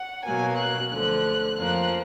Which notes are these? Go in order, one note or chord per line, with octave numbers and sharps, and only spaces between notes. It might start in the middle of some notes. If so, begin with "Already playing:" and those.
Already playing: F#5
B2 F#3 A#3 G#5
F#6
D2 D3 F3 F#6
F2 F3 A#3 F#6